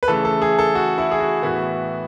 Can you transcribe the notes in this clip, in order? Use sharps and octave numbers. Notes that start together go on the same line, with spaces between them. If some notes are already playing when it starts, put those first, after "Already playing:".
B4
C#3 E3 A3 A4
A4
G#4
A4
F#4
E4
G#4
F#4
A2 E3 B3 F#4